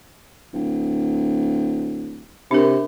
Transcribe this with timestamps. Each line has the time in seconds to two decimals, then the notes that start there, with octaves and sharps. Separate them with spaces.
0.53 D1
2.51 C3 D4 A#4